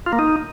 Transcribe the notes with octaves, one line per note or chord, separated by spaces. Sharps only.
F4
A#3
D#4